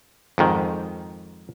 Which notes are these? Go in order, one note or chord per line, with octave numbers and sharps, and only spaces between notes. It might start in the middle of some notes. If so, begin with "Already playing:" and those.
F2 G#2 D#3